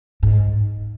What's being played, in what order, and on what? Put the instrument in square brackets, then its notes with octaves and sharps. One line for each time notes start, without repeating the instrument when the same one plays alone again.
[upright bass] G#2